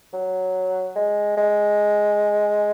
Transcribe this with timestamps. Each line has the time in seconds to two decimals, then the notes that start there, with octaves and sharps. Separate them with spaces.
0.13 F#3
0.96 G#3
1.37 G#3